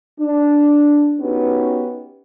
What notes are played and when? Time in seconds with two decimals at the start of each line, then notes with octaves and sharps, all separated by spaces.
0.20 D4
1.20 B3 C#4 D#4 F#4 G4